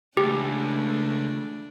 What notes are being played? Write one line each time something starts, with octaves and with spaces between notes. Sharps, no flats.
C#2 E3 A3 D4 G4